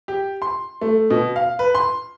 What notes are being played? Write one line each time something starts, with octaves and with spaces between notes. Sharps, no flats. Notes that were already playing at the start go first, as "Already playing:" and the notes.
G4
C6
A3
B2
F5
B4
C6